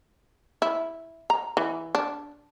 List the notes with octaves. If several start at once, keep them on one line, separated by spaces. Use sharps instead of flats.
E4
A#5
E3
D4